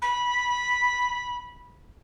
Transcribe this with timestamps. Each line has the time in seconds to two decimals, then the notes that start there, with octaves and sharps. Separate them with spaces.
0.02 B5